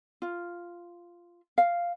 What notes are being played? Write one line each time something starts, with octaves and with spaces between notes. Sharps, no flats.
F4
F5